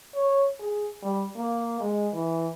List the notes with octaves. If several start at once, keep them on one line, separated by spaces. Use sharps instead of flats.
C#5
G#4
G3
A#3
G#3
E3